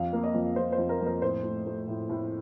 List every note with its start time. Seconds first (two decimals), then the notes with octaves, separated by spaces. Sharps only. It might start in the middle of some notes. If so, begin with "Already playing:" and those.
Already playing: F2 F5
0.13 A#3
0.24 D#5
0.34 F2
0.56 F2 C5
0.72 C5
0.78 F2
0.89 A#4
1.01 F2
1.06 A#4
1.22 A2 C5
1.43 A3
1.66 A3
1.88 A2
2.09 A2